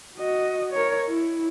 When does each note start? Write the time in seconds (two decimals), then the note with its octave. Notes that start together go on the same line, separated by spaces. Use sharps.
0.18 F#4 D#5
0.72 A#4 C#5
1.10 E4